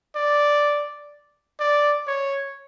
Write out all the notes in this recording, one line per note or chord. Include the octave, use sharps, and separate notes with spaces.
D5
D5
C#5